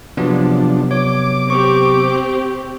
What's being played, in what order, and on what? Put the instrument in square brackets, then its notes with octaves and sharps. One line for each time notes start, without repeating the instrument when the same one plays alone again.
[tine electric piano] C3 F#3 B3 [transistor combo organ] F3 D4
[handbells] C#5 [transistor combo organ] D6
[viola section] C4 G4 [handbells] C#6